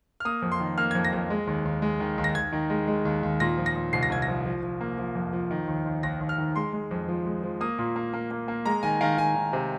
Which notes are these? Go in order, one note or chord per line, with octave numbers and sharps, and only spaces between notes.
F6
A#3 D#6
F2
C6
D#3
A#3 F6
F2 G#6
A#6
F2
G#3
D#2
D#2
G#3
D#3
D#2
A#6
D#2 G#6
D#3
G#3
G#3
D#2
D#2
A#2 A#6
F3
A#6
A#2
C2 C7
A#6
C2 G#6
A#6
F3
F3
F3
A#3
F3
F2
F3
D#3
D#2
D#2
D#2 A#6
D#2
F6
D#3
G#3 C6
G#3
F2
F3
G#3
F3
A#3 D#6
A#2
A#3
A#3
A#3
A#3
G#3 A#5
D#3 G#5
D#3 F5
D#3 G#5
D#3
C3